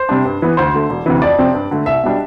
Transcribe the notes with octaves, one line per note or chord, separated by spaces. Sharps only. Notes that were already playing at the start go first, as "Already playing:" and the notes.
Already playing: C5
C3 G3 D4
G2
E3 B3
D2 C5
D3 A3
E1
D2 C3 E3
F2 D5
C3 F3 C4
G2
D3 A3
C2 E5
B2 G3 D4